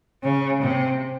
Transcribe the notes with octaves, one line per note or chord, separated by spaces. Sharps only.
C#3
C3